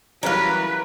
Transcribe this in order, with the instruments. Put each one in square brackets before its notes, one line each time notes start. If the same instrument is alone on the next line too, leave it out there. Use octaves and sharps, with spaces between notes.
[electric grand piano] E3 F#3 G3 [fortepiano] C#4 E4 [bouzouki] A#4 F5 [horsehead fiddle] B4